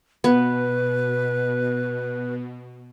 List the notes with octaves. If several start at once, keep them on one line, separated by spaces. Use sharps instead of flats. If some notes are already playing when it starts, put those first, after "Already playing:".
B2 B3 B4